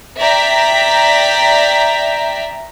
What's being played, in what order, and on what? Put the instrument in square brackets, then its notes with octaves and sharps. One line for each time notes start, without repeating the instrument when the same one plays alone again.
[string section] D5 E5 G5 A#5 B6